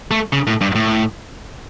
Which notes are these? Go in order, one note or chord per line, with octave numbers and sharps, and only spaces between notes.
A3
C#3
A2
G2
A2